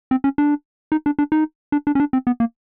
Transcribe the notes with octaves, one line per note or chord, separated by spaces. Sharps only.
C4
C#4
D4
D#4
D4
D4
D#4
D4
D4
C#4
D4
C4
B3
A#3